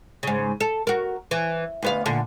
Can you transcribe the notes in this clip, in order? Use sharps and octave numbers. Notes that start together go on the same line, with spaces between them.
G#2 C#3
A4
F#4 A#4
E3
D2 B3 F5
A#2 D3